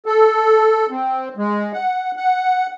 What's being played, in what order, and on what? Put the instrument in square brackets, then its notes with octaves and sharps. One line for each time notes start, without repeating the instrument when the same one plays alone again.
[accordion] A4
C4
G#3
F#5
F#5